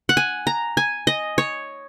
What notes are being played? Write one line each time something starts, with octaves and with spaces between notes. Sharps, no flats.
F#5
G#5
A#5
G#5
D#5
C#5